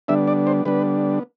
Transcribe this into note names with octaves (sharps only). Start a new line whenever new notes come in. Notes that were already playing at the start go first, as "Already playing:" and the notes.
D3 G3 B3 D4 E5
D5
C5
D3 G3 B3 D4 B4